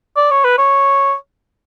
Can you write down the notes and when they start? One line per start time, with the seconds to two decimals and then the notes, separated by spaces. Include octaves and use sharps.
0.16 D5
0.31 C#5
0.44 B4
0.58 C#5